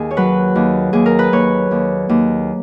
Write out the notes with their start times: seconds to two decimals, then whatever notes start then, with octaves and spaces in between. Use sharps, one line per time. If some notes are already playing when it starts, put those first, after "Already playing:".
Already playing: D#2 G#4
0.11 C#5
0.17 F#3 B4
0.56 D#2
0.93 D#2 G#4
1.06 A#4
1.19 B4
1.32 D#2 C#5
1.71 D#2
2.09 D#2